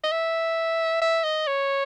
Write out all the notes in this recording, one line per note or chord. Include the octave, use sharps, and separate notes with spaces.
D#5
E5
E5
D#5
C#5